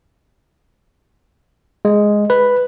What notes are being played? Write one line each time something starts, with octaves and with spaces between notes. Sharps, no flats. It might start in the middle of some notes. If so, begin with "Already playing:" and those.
G#3
B4